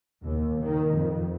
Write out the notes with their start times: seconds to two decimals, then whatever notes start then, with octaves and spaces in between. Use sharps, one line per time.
0.23 D#2
0.61 D#3
0.93 F2